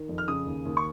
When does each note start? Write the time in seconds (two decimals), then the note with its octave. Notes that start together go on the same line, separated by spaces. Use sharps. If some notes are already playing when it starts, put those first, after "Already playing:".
Already playing: D#3
0.09 F2
0.18 F6
0.28 C#3 D#6
0.46 D#2
0.65 D#2
0.77 C#6